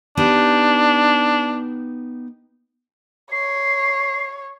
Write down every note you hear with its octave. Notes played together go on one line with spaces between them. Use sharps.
B3 D4 D#4 G4
C#5 C7